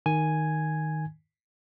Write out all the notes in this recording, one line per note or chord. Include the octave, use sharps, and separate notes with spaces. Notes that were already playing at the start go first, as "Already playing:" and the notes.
D#3 G#5 G#6